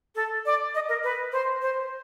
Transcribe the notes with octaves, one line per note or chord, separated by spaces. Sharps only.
A4
D5
D#5
A#4
B4
C5
C5